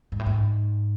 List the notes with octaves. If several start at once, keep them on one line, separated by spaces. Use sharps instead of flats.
G#2
A2
G#2